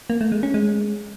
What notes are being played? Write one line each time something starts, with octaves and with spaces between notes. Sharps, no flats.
A#3
A3
G#3
C#4
G#3